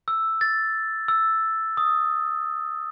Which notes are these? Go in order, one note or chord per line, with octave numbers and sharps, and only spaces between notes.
E6
A6
E6
D#6